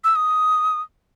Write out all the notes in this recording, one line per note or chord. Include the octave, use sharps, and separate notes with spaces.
E6
D#6